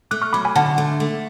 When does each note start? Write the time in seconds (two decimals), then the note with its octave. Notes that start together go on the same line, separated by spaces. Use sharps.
0.11 A3 D6 F#6
0.22 C#6 F6
0.33 F#3 B5 D6
0.45 G#5 B5
0.56 D3 F#5 A5
0.78 A3
1.00 A3